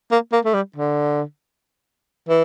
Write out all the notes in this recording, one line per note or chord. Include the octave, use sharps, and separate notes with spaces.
A#3
A#3
A3
G3
D3
E3